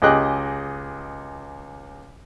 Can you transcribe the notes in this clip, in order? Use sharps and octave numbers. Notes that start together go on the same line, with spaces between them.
C#2 G4 G#4 D#5 G5 F#6